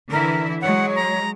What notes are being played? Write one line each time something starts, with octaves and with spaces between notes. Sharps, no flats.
D3 E3 E4 A#4
F#3 G#3 C#5 F#5
A#5